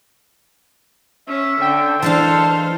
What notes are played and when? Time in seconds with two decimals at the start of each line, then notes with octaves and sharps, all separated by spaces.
1.28 C#4 E5
1.61 D3 G5
2.03 E3 G#3 D4 A4 C5 F5 A5